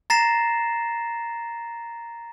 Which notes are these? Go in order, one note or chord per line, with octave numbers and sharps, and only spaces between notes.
A#5 A6 A#6 C7 E7